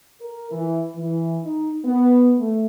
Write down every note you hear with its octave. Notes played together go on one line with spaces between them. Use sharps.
A#4
E3
E3
D#4
B3
A3